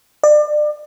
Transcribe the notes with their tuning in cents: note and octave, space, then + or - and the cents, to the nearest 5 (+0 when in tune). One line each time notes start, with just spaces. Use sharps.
D5 +30